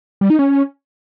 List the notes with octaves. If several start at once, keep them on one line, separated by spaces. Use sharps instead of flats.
G3
D#4
C#4